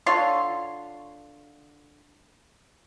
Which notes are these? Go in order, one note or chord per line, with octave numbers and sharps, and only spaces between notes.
D3 F4 C#5 C6